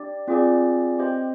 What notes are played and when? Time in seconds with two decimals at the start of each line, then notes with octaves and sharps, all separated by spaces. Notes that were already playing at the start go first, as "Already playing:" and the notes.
Already playing: D4 G4 D5
0.28 C4 F4 G#4 D5
0.99 C4 G4 C5 D#5